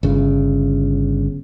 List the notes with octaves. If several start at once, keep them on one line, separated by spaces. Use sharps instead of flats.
G1 C#3